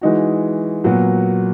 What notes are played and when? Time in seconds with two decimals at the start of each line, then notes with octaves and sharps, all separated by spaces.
0.01 E3 G#3 D#4 F#4
0.84 A#2 F#3 B3 F#4